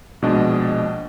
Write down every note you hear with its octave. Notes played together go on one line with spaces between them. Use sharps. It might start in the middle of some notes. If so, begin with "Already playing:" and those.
A#1 B2 G#3 D4 D#5